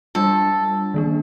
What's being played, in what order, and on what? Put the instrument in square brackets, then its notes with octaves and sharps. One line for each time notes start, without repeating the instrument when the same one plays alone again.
[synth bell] G3 D4 F4 [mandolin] A4
[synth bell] D#3 A#3 D4